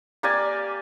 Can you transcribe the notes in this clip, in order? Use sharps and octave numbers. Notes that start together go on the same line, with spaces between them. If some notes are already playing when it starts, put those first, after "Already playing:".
A#3 G4 D5 G#5